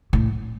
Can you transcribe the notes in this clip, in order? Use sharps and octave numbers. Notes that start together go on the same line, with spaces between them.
A2